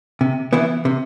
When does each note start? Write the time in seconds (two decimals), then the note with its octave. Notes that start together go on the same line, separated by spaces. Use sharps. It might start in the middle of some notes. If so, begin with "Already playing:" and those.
0.21 C3
0.53 E3 B3 E4
0.85 C3